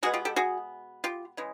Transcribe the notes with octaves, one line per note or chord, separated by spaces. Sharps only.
B2 G#3 B3 F#4 G#4
F4 G4
G4 A4
F#4 G#4
F4 G4
C#3 E3 G#3